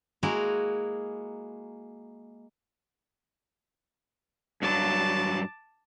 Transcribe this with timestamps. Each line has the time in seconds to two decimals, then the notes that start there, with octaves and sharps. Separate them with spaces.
0.23 G#3 A#3 E4 F#4 G#4 A#4
4.62 G2 F#3 A5 D6